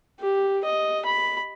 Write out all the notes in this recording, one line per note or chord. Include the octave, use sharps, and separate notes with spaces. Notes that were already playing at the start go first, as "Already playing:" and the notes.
G4
D#5
B5